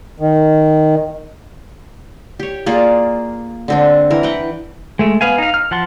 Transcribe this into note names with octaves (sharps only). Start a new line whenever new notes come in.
D#3
G4 C#5
A#3 F4 G#4 D5
D3 C4 D4
E3 A#4
B4 F#5 G5
G#3 A3
B3 B4 F5 G#5
D#4 F5
F6
F3 F#5 A5 C6